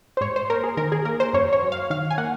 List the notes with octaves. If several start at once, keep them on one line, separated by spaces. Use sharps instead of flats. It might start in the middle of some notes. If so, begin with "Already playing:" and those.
C5
G#2 C#5
C5
A#3 A#4
G#4
D#3 A#4
G#4
A#3 A#4
C5
F#2 C#5
C#5
F#3
F5
D#3 F5
G#5
A#3 F#5